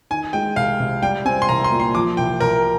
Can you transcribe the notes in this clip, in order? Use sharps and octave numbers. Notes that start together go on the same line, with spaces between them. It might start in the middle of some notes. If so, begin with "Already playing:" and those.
D#3 G#5
G#3 G5
C2 F5
C3
G3 G5
C4 G#5
C6
C2 A#5
C6
A#2
C6
F3 D6
C2 G5
C2 A#4